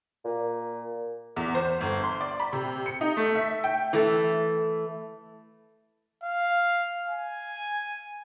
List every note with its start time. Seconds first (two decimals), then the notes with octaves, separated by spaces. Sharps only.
0.25 A#2
1.36 E2
1.55 C5
1.81 G1
2.04 C6
2.21 D5
2.40 B5
2.53 C3
2.86 C#7
3.01 D#4
3.17 A3
3.36 E5
3.64 G5
3.93 E3 A3
6.23 F5
7.08 G#5